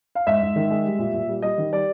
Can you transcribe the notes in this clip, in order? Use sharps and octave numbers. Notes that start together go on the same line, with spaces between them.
F5
G#2 E5
G#2
D#3
G#3
G3
A#2
A#2
G3
G3 D#5
D#3
G3 D5